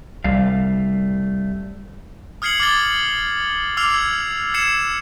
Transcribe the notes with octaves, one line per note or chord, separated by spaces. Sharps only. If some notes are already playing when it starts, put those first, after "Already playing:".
C2 G3 A3 F5
D#6 F6 G#6 C7 C#7 F#7
D6 F6 G#6 A6 G7
D6 E6 F6 C7 F7
G#6
E6 G#6 C7 C#7 E7